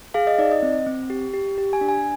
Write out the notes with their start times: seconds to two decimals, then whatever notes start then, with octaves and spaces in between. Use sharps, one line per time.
0.14 G#4 F5
0.27 D#5
0.38 D#4 D5
0.52 D#5
0.62 C4
0.86 C4
1.10 G4
1.34 G4
1.58 G4
1.73 G#5
1.81 D4
1.89 G#5